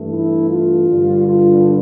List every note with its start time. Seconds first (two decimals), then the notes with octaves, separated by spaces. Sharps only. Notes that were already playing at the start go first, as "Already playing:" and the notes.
Already playing: G2 E3 A3
0.10 E4
0.50 F4
0.89 G2 D3 G3
1.29 F4